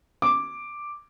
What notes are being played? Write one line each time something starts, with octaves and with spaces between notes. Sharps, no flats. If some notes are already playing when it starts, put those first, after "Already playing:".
D6